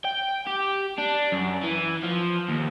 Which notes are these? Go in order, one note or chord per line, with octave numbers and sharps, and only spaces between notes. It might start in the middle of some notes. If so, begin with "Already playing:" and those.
G5
G4
D4
F#2
E3
F3
D#2